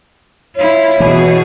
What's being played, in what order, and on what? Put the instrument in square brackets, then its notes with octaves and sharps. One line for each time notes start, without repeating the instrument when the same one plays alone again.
[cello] E4 F4 [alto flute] C#5
[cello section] B2 [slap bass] E3 [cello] G#4